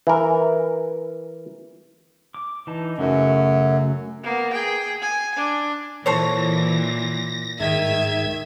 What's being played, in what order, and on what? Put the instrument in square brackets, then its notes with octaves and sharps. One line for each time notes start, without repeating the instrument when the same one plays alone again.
[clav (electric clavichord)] E3 A#4
[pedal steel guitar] D6
E3 D#4 A5
[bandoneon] F#2 [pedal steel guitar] C#3 A3 F#4
[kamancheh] A#3 B3
G#4 G5
G#5
D4
[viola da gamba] A#2 [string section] E3 [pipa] A4 C5 C#5 [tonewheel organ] A#6
[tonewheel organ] G#2 G#6 [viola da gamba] D#3 [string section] E5